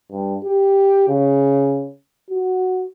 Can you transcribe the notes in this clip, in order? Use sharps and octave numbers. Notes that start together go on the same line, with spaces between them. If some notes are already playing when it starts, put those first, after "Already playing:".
G2
G4
C#3
F#4